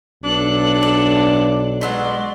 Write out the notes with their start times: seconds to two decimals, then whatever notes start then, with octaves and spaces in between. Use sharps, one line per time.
0.24 B1 D4 A4 F#6
0.83 D5
1.81 B2 F#3 G#3 D5 F#5 C6